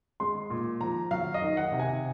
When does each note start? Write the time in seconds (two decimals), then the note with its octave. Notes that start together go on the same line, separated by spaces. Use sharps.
0.20 G#3 C6
0.50 A#2
0.81 F3 A#5
1.11 F#3 F5
1.34 D#5
1.42 D#3
1.57 F#5
1.72 C3
1.79 G#5